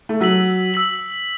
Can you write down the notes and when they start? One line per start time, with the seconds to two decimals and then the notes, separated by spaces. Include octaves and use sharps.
0.09 A3
0.20 F#3 E6 B6 F#7
0.74 E6 B6 F#7